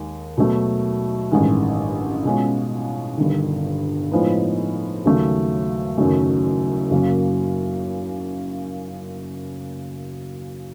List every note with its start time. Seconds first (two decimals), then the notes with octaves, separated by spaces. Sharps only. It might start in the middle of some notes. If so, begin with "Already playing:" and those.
Already playing: D#2 D#3 G#3
0.38 B2 F#3 A3
1.31 A1 G2 D#3 G#3
2.25 B2 G#3 C#4 F4
3.17 G1 G2 D#3
4.12 A2 F3 G#3 B3 D#4
5.05 D#2 C#3 F#3 A3
5.98 F#1 F#2 D#3 F#3 A3
6.91 F#2 C#3 F#3 A#3